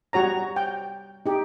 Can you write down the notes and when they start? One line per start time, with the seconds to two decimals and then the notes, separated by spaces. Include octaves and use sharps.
0.13 G3 F#4 C#5 A#5
0.56 G5
1.26 D#4 G4